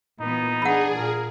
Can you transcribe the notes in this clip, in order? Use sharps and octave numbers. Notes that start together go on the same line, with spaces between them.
A#2 E3 B3 D#4
E3 D4 G#4 F#5 B5
A#2 A#4